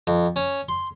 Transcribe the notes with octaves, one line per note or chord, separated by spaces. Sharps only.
F2
C#4
C6